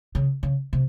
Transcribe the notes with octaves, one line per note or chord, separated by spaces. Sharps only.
C#3
C#3
C3